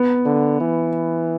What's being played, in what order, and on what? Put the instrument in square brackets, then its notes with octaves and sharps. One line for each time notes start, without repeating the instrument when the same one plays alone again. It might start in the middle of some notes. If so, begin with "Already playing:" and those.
Already playing: [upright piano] B3
[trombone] D3
E3